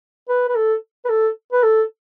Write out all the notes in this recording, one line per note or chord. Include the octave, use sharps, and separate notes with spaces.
B4
B4
A4
B4
A4
B4
A4